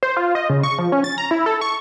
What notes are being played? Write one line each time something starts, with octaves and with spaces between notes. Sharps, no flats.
C5
F4
D#5
C#3
C#6
F3
C#4
A6
A#5
E4
A4
C#6